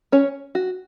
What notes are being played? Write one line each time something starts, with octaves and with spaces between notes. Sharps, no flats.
C#4 C#5
F#4